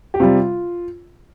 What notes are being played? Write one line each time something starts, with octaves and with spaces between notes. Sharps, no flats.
G4
C3 G3 F4